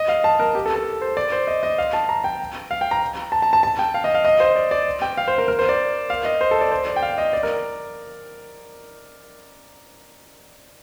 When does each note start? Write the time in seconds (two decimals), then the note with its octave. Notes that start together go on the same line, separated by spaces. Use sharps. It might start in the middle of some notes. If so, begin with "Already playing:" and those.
Already playing: D#5
0.09 F5
0.24 A5
0.40 A#4
0.55 G4
0.66 A4
0.76 A4
1.01 C5
1.17 D5
1.32 C5
1.47 D#5
1.63 D#5
1.78 F5
1.93 A5
2.09 A#5
2.24 G5
2.71 F5
2.81 G5
2.91 A#5
3.32 A5
3.42 A5
3.53 A5
3.63 A5
3.79 G5
3.94 F5
4.04 D#5
4.15 F5
4.25 D#5
4.40 C5
4.56 D5
4.71 D5
5.02 G5
5.17 F5
5.28 C5
5.38 A#4
5.48 A#4
5.59 C5
5.69 D5
6.10 F5
6.25 D#5
6.41 C5
6.51 A4
6.61 D5
6.71 C5
6.87 D5
6.96 G5
7.02 F5
7.18 D#5
7.33 D5
7.43 A#4